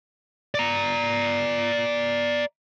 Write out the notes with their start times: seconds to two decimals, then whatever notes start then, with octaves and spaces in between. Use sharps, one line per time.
0.55 D5 A#5